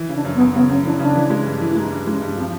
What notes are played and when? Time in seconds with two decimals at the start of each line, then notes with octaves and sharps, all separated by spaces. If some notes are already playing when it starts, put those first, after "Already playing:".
Already playing: E3
0.09 C#3 D4
0.25 F#2
0.35 B3
0.40 F#2
0.55 C#3 B3
0.70 F#2 C#4
0.85 E3 D4
1.00 C#3 D4
1.15 E3
1.30 G#3
1.46 G2
1.61 E3
1.71 E4
1.76 G#3 D#4
1.91 G2
2.07 G#3 C#4
2.21 G2
2.37 F3 C4